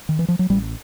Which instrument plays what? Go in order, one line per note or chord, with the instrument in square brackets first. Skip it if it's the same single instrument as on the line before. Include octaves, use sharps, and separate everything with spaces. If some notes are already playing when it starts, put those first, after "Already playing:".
[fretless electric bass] D#3
E3
F3
F#3
A1 G3